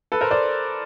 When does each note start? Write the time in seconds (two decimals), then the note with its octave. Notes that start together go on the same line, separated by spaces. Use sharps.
0.12 A4 B4
0.21 A#4 C5
0.31 C5 D5